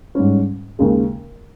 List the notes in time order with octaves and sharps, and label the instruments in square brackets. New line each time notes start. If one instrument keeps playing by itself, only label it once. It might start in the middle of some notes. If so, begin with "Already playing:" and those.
[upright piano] G#2 G3 C#4
D#2 C#3 G#3